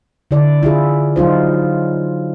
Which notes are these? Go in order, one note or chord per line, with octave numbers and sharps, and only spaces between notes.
D3 E4 D5
E4 F4 G#4
F#3 D#4 F4 C5